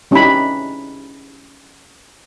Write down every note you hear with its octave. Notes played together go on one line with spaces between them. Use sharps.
G3 C#4 D#4 E4 G4 B5